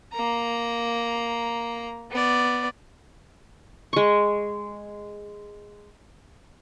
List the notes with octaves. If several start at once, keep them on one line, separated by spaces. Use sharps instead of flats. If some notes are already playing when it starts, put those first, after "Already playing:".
A#3 A#5
B3 D5
G#3 C#6